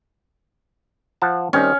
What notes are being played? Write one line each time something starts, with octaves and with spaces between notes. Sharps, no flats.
F3 F#5 A5
D#3 G3 C4 C#4